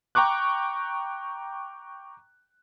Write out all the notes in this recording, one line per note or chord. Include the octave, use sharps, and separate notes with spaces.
G5 A#5 C#6 D6 F#6